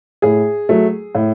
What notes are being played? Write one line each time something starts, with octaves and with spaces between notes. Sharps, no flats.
A2 G#4
F#3 A3
A2